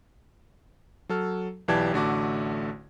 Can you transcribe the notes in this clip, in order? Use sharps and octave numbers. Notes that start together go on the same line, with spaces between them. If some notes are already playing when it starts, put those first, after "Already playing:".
F#3 A4 F6
B1 E3 G4 D5 A5 G#6
A1 D3 A3 F#4 D6